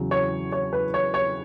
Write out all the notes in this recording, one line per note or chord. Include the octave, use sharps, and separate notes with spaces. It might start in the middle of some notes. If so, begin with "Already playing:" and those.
Already playing: E2 C#3 F#3
C#5
C#5
B4
C#5
C#5